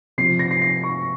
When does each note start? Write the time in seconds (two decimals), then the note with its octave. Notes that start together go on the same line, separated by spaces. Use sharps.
0.18 C3 F3 C7
0.39 A#6
0.51 C7
0.62 C7
0.83 C#6